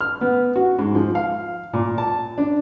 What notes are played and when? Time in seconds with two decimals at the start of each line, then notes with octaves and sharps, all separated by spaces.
0.01 F6
0.21 B3
0.56 F#4
0.79 G#2
0.95 F3
1.15 F5
1.73 A#2
1.98 A5
2.38 D4